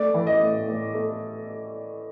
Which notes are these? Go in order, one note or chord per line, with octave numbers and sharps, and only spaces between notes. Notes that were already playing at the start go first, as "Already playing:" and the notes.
Already playing: A3 D5
E3
D#5
A2
A2
A3